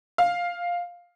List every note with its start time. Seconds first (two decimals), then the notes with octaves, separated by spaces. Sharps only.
0.18 F5